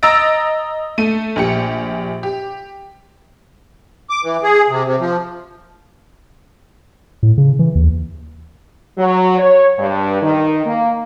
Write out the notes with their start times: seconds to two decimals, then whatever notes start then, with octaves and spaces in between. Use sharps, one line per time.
0.03 D#5 A#5 E6 A6 A#6 D7
0.98 A3 D#7
1.36 A#1 G4 C#7
2.23 G4
4.10 D6
4.24 E3
4.43 G#4
4.70 C3
4.85 C3
5.00 F3
7.23 A2
7.38 C#3
7.59 E3
7.75 D#2
8.97 F#3
9.38 C#5
9.78 G2
10.21 D#3
10.65 A#3